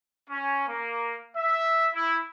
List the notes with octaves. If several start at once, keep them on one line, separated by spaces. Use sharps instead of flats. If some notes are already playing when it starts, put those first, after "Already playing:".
C#4
A#3
E5
E4